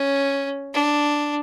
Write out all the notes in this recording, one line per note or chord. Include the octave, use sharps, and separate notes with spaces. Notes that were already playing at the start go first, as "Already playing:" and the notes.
Already playing: C#4
D4